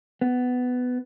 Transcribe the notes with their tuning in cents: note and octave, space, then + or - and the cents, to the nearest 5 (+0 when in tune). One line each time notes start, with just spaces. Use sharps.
B3 +15